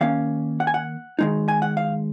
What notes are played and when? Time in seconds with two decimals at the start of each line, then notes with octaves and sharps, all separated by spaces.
0.01 D#3 A#3 C#4 F5
0.60 F#5
0.67 G#5
0.74 F#5
1.19 D#3 G#3 D#4
1.48 G#5
1.62 F#5
1.77 F5